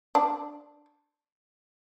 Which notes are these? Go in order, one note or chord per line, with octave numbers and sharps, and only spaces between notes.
D4